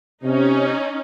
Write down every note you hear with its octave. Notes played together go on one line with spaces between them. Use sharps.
C3 C#4 D#4